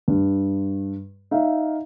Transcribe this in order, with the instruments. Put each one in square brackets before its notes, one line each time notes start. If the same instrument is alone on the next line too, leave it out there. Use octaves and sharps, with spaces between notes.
[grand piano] G2
D#4 E5 F5